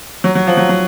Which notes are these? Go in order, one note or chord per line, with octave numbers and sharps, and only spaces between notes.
F#3
F#3
F3
F#3
F#3